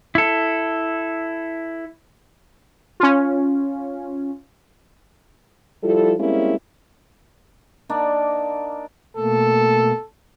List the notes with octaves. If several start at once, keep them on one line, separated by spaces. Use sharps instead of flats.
E4 A4
C#4 F4
F3 G3 E4 F4 A4
G3 G#3 A#3 C4 C#4 E4
A#3 D4 D#4 D5
B2 A3 A#3 A4